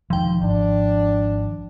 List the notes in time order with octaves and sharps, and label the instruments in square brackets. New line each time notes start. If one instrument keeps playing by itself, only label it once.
[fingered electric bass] E1 D#3 [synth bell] F3 G5
[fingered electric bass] G#1 [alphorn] D4